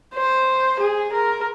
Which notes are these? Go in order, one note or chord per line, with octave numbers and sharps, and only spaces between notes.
C5
G#4
A#4